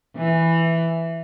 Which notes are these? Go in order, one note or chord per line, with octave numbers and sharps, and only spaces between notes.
E3